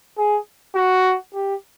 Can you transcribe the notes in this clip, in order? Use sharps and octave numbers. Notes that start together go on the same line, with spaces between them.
G#4
F#4
G4